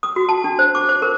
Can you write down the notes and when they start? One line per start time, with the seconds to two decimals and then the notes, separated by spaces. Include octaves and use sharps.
0.03 D#6
0.16 F#4
0.29 A5
0.44 D4
0.59 C5
0.75 D6
0.89 C5
1.02 A#4